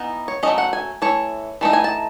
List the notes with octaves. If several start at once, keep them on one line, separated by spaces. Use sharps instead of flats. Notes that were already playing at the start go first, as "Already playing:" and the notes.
Already playing: E3 B3 D#4
C#5
F#3 A3 C#4 D#5
F#5
G#5
E3 A3 C#5
E3 A3 D#4
G#5
A5